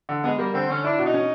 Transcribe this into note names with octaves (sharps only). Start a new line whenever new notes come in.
D3
G#3 B3
G3 A#3
D3 C4
D3 C#4
D4 E4
B2
D#4
C#4